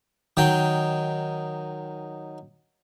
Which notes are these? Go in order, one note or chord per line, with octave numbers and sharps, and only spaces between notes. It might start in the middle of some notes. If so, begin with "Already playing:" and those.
D#3 F#3 G5